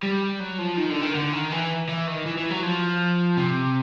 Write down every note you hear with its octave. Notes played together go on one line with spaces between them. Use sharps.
G3
F#3
F3
D#3
D3
D#3
D3
D#3
E3
E3
D#3
E3
E3
F#3
F3
C3